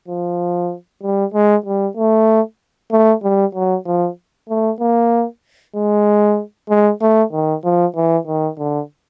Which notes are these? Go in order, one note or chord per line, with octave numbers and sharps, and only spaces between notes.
F3
G3
G#3
G3
A3
A3
G3
F#3
F3
A3
A#3
G#3
G#3
A3
D#3
F3
E3
D#3
D3